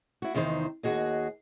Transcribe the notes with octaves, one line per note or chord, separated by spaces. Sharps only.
E4 F#4
E2 C3 D#3 D#4 C5
D#2 F#4 G#4 D#5